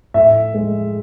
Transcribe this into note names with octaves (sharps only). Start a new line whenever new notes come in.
A2 E5
G#3